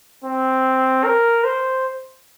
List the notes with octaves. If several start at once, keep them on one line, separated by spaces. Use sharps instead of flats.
C4
A#4
C5